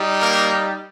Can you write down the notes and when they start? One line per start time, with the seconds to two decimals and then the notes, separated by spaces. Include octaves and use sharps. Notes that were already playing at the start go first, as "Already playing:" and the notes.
Already playing: G3 D#4
0.20 A#3 A#4